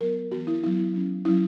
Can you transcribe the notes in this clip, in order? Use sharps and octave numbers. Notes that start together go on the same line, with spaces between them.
F#3 B3 A#4
E3 B3 F#4
E4
F#3 B3 E4
F#3 C#4
F#3 C#4 E4